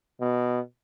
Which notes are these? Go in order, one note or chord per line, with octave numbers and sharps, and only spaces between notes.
B2